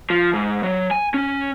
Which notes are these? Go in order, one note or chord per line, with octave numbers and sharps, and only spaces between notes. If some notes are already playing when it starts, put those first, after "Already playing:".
F3
G#2
F#3
G#5
C#4